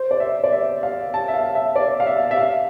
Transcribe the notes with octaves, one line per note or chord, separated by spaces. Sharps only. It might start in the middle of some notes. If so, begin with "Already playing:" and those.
Already playing: C5
D5
E5
D5
E5
F5
A5
E5
F5
E5
D5
F5
E5
E5
F5